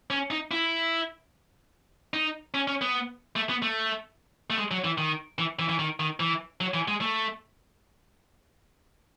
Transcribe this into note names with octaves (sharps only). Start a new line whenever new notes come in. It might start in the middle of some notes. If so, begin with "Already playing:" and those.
C#4
D#4
E4
D#4
C#4
C#4
B3
A3
B3
A3
A3
G#3
F#3
E3
D#3
E3
E3
E3
D#3
D#3
E3
F#3
E3
G#3
A3